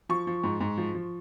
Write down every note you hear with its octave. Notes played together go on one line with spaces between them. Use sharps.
F3 C#6
F3
G#2
G#2
F3
F3